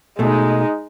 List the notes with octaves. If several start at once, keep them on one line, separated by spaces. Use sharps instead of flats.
B2 G#3 A3 D#4